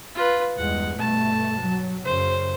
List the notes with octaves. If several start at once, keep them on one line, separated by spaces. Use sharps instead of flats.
F4 B4
E2 G2 G#3 F#5
G2 B2 A3 A5
F#3
F#2 C#3 C5